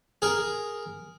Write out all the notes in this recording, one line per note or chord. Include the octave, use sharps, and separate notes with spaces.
G#4 A#4